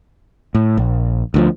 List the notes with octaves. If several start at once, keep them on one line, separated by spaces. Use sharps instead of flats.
A2
A#1
D2 D#3 F3